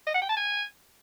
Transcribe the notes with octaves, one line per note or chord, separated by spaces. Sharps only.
D#5
F#5
G5
A5
G#5